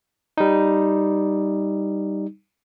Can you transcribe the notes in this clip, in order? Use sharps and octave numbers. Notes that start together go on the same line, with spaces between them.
G3 D#4